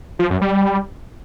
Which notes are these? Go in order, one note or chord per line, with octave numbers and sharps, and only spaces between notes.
F3
F#2
G3